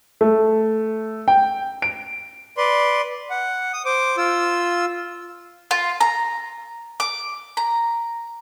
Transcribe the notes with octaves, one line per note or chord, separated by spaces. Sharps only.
A3
G5
D7
B4 D5 C6
F#5
D#6
C5 D6
F4 E6
F4
A#5
D6
A#5